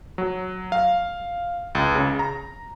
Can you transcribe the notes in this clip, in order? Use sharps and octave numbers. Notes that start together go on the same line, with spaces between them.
F#3
F5
C#2
C#3
A#5